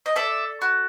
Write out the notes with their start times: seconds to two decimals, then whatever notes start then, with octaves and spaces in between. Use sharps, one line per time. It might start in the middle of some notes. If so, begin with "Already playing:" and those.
0.06 D#5
0.16 A4 D5 E5
0.62 F#4